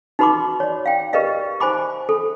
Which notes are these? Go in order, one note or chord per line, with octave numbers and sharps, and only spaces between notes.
D#4 F#4 B4 B5 C6 D6
C#5 D5
F5 G5
G4 A#4 B4 D5 D#5 F5
D#4 C5 G#5 B5 D6
A4